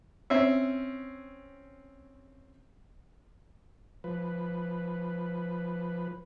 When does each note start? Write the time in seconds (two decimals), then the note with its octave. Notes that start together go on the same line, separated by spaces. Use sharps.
0.30 C4 C#4 E5
4.04 F3 B4